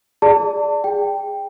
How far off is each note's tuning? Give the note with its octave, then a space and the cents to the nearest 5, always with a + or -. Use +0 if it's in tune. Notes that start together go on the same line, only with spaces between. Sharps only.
G#4 +0 D5 +0 A5 +30
G#4 -15 G5 +5